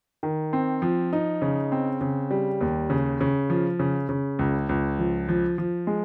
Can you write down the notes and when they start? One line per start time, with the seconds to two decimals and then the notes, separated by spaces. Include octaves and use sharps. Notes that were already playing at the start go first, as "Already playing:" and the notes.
0.23 D#3
0.53 C4
0.82 F3
1.13 D#4
1.42 C#3
1.72 C4
2.01 C#3
2.31 G3
2.61 D#2
2.90 C#3
3.21 C#3
3.50 F3
3.79 C#3
4.09 C#3
4.39 C#2
4.69 C#2
4.99 F3
5.28 F3
5.58 F3
5.87 G#3